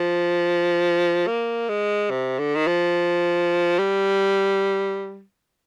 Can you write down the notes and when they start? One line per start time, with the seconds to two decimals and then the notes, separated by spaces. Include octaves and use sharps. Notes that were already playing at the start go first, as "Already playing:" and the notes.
Already playing: F3
1.27 A#3
1.69 G#3
2.10 C3
2.39 D3
2.55 D#3
2.67 F3
3.79 G3